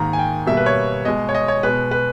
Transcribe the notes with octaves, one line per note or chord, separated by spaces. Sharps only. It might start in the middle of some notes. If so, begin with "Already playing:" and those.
Already playing: G#2 D#3 A#3 A#5
G#5
G5
B2 G3 A#3 E5
B4
C#5
B2 G#3 D#5
C#5
D#5
C#5
B2 G#3 B4
B4